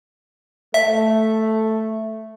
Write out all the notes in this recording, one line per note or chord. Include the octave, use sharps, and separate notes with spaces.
A3 E5